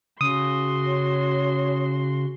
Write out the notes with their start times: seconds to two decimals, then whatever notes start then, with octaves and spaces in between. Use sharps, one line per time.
0.21 C#3 F#4 C6 D#6
0.86 C#5